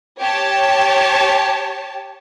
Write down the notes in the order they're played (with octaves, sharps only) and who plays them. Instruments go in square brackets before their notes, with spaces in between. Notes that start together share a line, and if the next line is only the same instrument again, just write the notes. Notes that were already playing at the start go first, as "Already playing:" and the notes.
[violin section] G4 C#5 A5